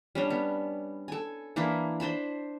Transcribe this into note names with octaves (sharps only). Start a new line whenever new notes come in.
G3 C#4 D4
B3
A4 G#5
E3 A#3 D4 E4
D4 C5 A5 B5